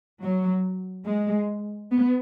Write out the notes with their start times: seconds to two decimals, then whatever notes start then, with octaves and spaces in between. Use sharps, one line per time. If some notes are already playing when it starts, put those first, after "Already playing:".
0.23 F#3
1.07 G#3
1.92 B3